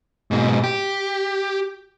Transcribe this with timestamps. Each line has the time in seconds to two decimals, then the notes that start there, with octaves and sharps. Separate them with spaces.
0.31 G#2 B2
0.64 G4